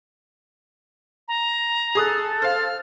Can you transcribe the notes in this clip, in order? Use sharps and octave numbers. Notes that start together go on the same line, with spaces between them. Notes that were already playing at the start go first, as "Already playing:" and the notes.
A#5
G#4 A4 D#6 F#6
C5 F5 F6